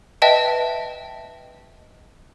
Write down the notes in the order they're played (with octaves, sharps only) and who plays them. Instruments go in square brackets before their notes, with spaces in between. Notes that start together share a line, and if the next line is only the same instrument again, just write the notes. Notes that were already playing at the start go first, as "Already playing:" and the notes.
[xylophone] B4 D#5 E5 G5 A5